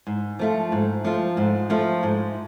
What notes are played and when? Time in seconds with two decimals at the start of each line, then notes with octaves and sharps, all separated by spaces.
0.07 G#2
0.39 F3 A3 F4
0.72 G#2
1.05 F3 A3 F4
1.37 G#2
1.70 F3 A3 F4
2.03 G#2